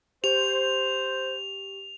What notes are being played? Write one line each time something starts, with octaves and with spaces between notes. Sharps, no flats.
G4 C5 F7